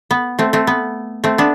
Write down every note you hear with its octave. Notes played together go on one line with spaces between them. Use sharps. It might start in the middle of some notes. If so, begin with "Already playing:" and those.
B3
A3 C4
A3 C4
B3
A3 C4
B3 D4